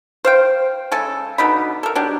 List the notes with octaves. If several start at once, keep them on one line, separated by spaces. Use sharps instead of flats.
C5 F5 G5
C#3 G#3 A4
B2 D3 D#4 B5
A4 A#4
F#3 D4 G4